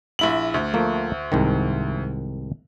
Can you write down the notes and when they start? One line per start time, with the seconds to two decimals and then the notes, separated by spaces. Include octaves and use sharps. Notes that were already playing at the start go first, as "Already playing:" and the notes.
0.19 A#1 E4 F#7
0.54 D2
0.74 F3 A3 A#3
1.32 C2 G#2 D#3